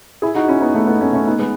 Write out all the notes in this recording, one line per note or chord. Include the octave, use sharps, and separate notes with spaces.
E4 G#4
D#4 F#4
C#4 E4
B3 D#4
A3 C#4
B3 D#4
A3 C#4
A3 C#4
B3 D#4
G#3 B3